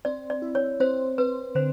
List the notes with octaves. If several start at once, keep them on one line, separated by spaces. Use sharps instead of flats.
C4 D5
D5
E4
C#5
C4 C5
C4 B4
D3 C5